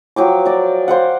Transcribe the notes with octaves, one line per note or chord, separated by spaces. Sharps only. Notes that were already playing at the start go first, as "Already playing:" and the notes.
F3 F#3 G5 D6
A#4 D5
C5 F5 F#5